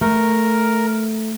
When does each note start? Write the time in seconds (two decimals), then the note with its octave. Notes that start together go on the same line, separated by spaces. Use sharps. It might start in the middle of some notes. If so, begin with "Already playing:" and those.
0.01 A3 A#4